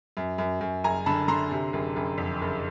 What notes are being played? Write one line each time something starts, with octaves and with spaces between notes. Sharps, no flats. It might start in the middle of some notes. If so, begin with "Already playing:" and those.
F#2
F#2
F#2
F#1 G#5 A#5
D3 A5 B5
D3 A#5 C6
C3
F#1
F#1
F2
F#1